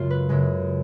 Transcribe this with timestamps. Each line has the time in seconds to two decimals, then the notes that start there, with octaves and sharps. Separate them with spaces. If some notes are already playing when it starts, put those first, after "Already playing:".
Already playing: F#2 C#3 G#3 F4
0.10 B4
0.29 F#2 C#3 G#3